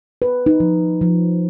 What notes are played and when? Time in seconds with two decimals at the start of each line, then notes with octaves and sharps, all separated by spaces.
0.22 B4
0.46 D#4
0.60 F3
1.01 F3